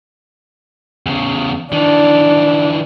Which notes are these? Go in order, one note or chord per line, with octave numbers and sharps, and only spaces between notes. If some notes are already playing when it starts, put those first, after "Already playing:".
E2 C#3
D#3 E3 D4